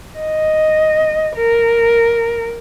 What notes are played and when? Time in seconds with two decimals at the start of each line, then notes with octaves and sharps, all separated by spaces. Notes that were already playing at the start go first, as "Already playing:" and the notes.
0.19 D#5
1.36 A#4